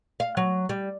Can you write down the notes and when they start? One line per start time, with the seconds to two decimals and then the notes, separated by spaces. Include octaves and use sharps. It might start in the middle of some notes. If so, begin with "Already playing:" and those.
0.20 F5
0.37 F#3
0.69 G3